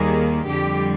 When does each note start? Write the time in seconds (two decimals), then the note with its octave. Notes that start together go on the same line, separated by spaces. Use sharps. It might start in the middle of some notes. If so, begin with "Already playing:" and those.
Already playing: D#2 D#3 G3 A#3 G#4
0.47 F2 D3 G3 G4